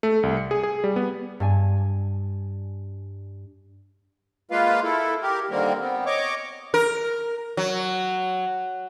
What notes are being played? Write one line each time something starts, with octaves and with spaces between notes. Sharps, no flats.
A3
C2
C#7
G#4
G#4
G3
B3
G2 D4 G#5
G#3 A#3 F4 B4 F5
E4 A4
G4 A#4
D3 D#3 G3 A#3 C4 A#4
B3 C4
C#5 D#5 C#6 D6
A#4
F#3